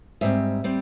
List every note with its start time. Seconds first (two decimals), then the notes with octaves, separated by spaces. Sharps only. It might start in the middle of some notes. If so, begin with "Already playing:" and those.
0.21 G#2 G3 C4 E5
0.64 G3 C4